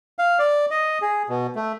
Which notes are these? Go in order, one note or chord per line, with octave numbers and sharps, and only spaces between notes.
F5
D5
D#5
G#4
B2
A3